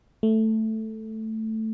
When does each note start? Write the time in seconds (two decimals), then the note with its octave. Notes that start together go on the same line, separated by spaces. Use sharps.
0.23 A3